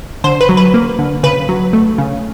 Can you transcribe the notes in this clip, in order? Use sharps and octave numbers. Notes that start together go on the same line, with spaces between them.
D3 C5
B4
F#3
B4
A#3
D3
C#3 B4
F#3
A3
C#3